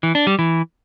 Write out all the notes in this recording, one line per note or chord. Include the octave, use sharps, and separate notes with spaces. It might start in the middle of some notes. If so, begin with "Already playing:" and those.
E3
D4
G3
E3